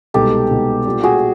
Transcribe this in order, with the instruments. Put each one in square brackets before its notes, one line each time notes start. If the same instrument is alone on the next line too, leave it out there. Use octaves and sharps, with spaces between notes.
[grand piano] C2 B2 G#3 B3 D#4 [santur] G4 A4
[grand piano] C2 B2 G#3 B3 D#4
A#2 G3 B3 D4
[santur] F#4 G#4